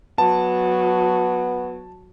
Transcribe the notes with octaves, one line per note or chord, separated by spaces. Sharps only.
F#3 B3 A5